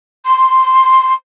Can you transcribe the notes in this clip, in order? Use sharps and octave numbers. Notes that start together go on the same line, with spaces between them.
C6